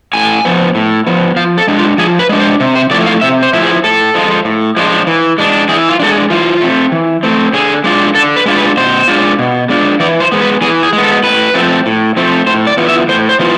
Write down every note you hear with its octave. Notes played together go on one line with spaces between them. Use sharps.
A2 G#5
F3 B3
A2
F3 B3
F3 F5
A4
G#3 D4
F4
F3 G#4
B4
G#3 D4
C5
C3
C5
F3 A3 E4 D5
F5
C3 E5
C5
F3 A3 E4
G#4
A2 A4
F3 G#3 D4 F4
A2
F3 G#3 D4 F4
E3
G#3 D4
E3 G#4
F4
G#3 D4 A4
G#4
E3 F4
A3 C4
E3
A3 C4
D3 G#4
G#3 D4 F4
D3 A4
B4
G#3 D4 F4
B4
B2 C5
G#3 D4 F4
B2
G#3 D4 F4
E3 D5
C5
G#3 B3
B4
E3 G#4
G#4
G#3
B3
A4
A2 B4
F3 A3 C4
A2
F3 A3 C4
A2 C5
D5
E3 B3 F4
E5
A2 C5
C5
E3 B3 F4